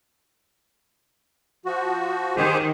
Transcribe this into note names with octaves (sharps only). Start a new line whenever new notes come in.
F3 F#4
D#3 G4 G#4 C5